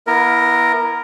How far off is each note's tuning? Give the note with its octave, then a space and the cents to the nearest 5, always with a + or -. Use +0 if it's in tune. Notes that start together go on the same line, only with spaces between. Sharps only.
B3 -30 E4 +0 A#4 +0